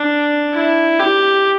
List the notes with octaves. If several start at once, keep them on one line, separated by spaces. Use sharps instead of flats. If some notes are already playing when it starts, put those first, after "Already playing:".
Already playing: D4
E4
G4